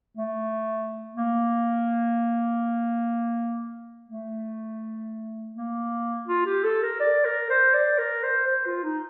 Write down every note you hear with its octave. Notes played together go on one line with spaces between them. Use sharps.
A3
A#3
A3
A#3
F4
G4
A4
A#4
D5
A#4
C5
D5
A#4
C5
C5
F4
D#4